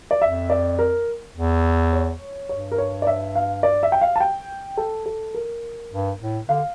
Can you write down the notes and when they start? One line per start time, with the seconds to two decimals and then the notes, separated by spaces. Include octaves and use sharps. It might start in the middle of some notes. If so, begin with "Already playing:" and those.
0.11 D5
0.22 F2 E5
0.50 D5
0.79 A#4
1.35 E2
1.93 C#5
2.49 G2 C#5
2.72 A#4
2.78 C#5
3.02 D5
3.07 E5
3.35 F5
3.63 D5
3.83 E5
3.92 G5
4.01 F5
4.16 A5
4.21 G5
4.77 A4
5.06 A4
5.34 A#4
5.92 G2
6.20 A2
6.48 D3 F5